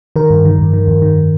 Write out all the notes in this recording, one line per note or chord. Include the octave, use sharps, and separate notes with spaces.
D#3 A#4
G2
D#3
G2
D#3
F2
D#3